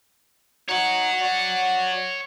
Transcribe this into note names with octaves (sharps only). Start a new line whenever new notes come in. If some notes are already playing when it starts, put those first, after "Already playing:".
D#4 F#4 C#5 F#5
F#4 D5